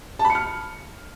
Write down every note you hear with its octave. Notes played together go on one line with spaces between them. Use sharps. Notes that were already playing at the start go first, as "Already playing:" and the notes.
A5
B5
C#7
F6